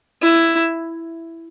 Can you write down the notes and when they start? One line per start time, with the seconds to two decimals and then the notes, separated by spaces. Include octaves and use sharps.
0.22 E4